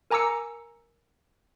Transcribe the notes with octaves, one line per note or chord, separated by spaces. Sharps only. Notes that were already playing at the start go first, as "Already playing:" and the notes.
A#4 G#5 A#5 D6 E6 C#7